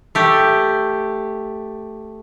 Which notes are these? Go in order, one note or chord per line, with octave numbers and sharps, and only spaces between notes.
A3 G4